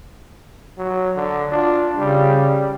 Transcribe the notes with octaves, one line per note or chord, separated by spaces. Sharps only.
F#3
D3
D4 F4
C#3 G3